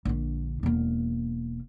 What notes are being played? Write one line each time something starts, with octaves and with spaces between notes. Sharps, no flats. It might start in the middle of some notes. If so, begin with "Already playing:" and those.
A#1 D3
E1 A#3